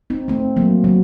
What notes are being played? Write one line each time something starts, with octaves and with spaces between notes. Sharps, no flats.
C4 D#4
A3 C4
F#3 A#3
F#3